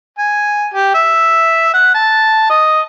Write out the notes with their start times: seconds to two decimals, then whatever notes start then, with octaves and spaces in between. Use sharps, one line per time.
0.19 G#5
0.74 G4
0.95 E5
1.74 F#5
1.95 A5
2.50 D#5